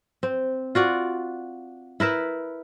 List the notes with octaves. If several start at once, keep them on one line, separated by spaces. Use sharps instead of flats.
C4
F4 F#4 D5
E4 A#4 B4 E5